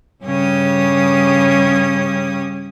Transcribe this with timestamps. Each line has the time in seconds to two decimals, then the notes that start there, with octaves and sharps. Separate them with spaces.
0.23 G2 C#3 C#4 G4 D#6